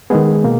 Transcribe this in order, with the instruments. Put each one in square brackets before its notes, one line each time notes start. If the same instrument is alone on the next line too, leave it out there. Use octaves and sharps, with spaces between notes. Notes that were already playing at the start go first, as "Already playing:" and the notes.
[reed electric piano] D#3 G#3 B3 G#4
B2 A#3